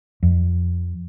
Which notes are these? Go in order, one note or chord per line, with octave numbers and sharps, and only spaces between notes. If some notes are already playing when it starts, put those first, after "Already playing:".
F2